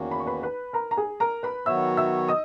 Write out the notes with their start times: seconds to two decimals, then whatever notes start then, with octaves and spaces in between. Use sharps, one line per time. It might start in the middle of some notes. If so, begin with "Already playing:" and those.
Already playing: E2 D#3 A#3 C#4 F#4
0.11 B5
0.20 C#6
0.26 B4 B5
0.43 B4 B5
0.73 A#4 A#5
0.91 A#5
0.97 G#4 G#5
1.20 A#4 A#5
1.43 B4 B5
1.66 D#3 F#3 B3 F#4 C#5 E5 E6
1.97 E5 E6
2.28 D#5 D#6